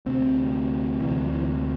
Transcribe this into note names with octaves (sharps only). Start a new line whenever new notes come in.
D2 C3 C4
D2 C3 E3
F3
E3